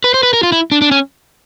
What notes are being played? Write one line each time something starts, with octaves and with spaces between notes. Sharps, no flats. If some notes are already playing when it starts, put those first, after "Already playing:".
B4
C5
B4
A#4
F4
E4
D4
D4
C#4